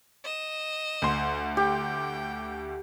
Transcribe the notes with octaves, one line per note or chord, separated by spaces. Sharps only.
D#5 E7
D2 C6
G4 G5